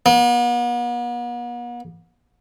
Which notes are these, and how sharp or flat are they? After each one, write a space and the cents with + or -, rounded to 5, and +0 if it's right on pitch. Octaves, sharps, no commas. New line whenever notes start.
B3 -45